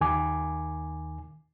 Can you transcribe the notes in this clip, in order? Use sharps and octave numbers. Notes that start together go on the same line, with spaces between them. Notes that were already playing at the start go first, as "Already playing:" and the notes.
D#2 D#3 G#5 D6